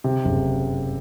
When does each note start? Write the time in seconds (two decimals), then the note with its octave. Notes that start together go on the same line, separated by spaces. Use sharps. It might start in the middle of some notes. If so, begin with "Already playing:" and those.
0.04 C3
0.25 F#1